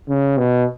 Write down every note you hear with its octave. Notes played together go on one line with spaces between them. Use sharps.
C#3
B2